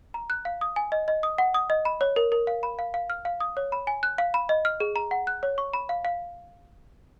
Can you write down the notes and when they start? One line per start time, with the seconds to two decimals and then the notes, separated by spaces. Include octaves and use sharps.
0.14 A#5
0.30 F#6
0.45 F5
0.61 D#6
0.76 G#5
0.92 D#5
1.08 D#5
1.23 D#6
1.38 F#5
1.54 D#6
1.70 D#5
1.85 B5
2.01 C#5
2.16 A#4
2.32 A#4
2.47 F5
2.63 B5
2.79 F5
2.94 F5
3.10 F6
3.25 F5
3.40 D#6
3.57 C#5
3.72 B5
3.87 G#5
4.03 F#6
4.18 F5
4.34 B5
4.49 D#5
4.65 F6
4.80 G#4
4.96 A#5
5.11 F#5
5.27 F#6
5.43 C#5
5.58 C#6
5.73 B5
5.89 F5
6.05 F5